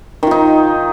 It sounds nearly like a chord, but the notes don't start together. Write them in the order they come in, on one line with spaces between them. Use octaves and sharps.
D#3 F4 D#4